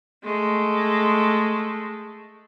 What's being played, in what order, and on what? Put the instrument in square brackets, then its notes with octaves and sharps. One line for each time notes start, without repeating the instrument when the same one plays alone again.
[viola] G#3 A3